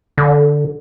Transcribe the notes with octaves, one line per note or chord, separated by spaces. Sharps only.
D3